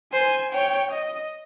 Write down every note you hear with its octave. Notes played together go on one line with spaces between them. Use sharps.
C5 G#5
C#5 G5
D#5